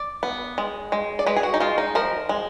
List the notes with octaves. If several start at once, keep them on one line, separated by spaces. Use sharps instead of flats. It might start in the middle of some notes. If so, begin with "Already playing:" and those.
Already playing: D5
B3
G#3
G#3
D5
G#3 B4
G#4
F#4
D#4
G#3 F4
D#4
F3 A#4
G#3